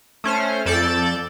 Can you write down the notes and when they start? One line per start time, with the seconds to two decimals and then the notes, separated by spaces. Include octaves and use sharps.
0.24 A3 C#4 C5 F6
0.66 F2 A4 D5 G6 A6 E7